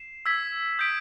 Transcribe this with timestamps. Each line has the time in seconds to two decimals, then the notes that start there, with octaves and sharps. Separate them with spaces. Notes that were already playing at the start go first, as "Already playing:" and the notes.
Already playing: C7 E7
0.26 E6 G#6 B6
0.79 D#6 G6 B6 D7